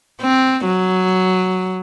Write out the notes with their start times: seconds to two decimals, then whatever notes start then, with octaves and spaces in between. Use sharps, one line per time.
0.21 C4
0.66 F#3